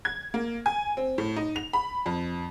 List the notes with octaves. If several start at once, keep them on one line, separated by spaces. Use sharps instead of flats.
G#6
A#3
G#5
C4
A2
D#4
F7
B5
F2